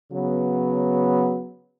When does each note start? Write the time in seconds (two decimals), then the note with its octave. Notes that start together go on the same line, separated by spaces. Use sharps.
0.11 C#3 F#3 B3